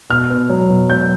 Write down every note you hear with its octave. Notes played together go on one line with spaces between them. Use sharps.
B2 F6
B3
F#3
B2
F#3 G6